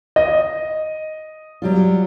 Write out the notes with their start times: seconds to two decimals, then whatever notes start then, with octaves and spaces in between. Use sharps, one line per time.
0.16 D#5
1.62 F#3 G3 F4